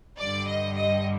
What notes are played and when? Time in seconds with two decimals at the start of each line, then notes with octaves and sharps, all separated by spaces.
0.19 G2 D3 G3 D5
0.48 D#5
0.76 D#5